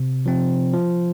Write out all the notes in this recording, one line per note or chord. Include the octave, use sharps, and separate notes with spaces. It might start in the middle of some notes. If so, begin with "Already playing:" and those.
Already playing: C3
F3 C4
F3